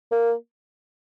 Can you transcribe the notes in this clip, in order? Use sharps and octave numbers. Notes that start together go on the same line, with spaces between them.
A#3